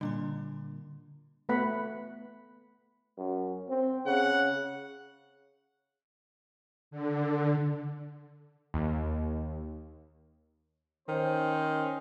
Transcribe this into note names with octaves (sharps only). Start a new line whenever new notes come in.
A#2 D3 G3 D4 C6
A3 B3 B4 F#5 B5
F#2
C4
C#3 F#5
D3
D#2
D#3 C#4 C5